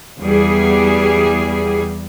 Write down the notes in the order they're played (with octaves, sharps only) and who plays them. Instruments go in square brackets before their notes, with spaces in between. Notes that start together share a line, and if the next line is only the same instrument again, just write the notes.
[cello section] E2 G3 G#4